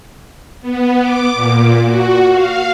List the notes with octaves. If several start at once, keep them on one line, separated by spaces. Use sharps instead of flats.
B3
D6
A#2
F#4
F5